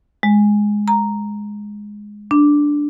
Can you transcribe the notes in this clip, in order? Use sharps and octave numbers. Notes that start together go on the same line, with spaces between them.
G#3
A#5
D4